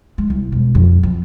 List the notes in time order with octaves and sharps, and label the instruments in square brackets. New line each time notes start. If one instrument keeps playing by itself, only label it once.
[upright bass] G#3
C2
E1
F2
F2